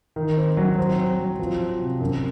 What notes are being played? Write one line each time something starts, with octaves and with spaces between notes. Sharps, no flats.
D#3
C4
F#3
C4
C4
F#3
F3
C4
C3
F#2